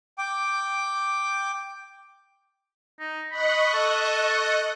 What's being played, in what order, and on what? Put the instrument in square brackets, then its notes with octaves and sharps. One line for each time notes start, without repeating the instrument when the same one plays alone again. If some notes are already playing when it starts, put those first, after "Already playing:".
[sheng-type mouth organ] G5 D6
[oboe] D#4
[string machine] D#5 C#6 F#6 [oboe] B5
[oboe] A4